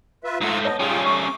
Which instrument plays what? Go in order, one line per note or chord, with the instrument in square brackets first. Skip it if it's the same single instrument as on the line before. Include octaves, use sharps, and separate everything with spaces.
[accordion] F4 B4 E5
[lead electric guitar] G#2 A3 [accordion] F4 F#5 A#5
[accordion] B3 D#5 [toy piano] C#5 A5
[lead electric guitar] G3 C#4 [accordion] F4 G#4 G5
[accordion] A3 D6 [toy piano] C#6